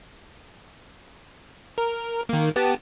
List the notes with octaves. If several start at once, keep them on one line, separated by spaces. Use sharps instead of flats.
A#4
D#3 A#3
B3 G4 A5